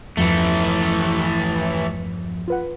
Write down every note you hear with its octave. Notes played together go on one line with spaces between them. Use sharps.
E2 G2 E3 F3 A3
F4 B4 F#5